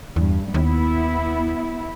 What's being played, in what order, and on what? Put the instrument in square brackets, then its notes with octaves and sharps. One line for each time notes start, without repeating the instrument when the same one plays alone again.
[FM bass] E2 [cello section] G2
[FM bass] D#2 [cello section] B3 E4